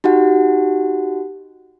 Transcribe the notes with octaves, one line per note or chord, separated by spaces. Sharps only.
D#4 F#4 G4 F#5